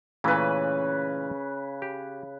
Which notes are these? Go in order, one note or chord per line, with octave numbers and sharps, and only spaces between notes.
A#2 C#3 E3 A3 B4
G4